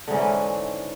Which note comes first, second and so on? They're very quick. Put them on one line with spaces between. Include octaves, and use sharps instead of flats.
D3 G#2 C#4 E3